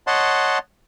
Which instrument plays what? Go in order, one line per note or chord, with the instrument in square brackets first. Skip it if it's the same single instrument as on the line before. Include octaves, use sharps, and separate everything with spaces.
[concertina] C#5 D#5 F#5 A5 C6